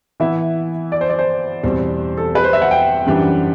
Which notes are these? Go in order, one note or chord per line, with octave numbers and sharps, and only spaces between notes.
E3 B3 E4 E5
D5
C5
D5
C5
E2 B2 G3 C4
A4
B4
C5
E5
F#5
G5
F#2 E3 G3 D4 G4